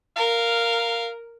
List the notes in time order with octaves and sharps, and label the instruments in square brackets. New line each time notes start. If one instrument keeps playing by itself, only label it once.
[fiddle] A#4 [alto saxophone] F5